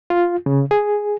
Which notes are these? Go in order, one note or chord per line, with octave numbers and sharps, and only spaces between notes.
F4
C#3
G#4